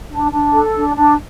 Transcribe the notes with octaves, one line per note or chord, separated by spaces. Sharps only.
D4
D4
A4
D4
D4